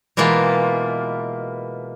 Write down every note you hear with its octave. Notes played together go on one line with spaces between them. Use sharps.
B2 E3 G#3 A#3 F4